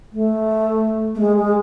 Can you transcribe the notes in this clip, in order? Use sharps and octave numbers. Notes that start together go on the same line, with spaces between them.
A3
A3
G#3
G#3